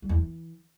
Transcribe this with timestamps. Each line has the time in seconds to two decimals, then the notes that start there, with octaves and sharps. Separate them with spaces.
0.02 G3
0.09 E2
0.16 E3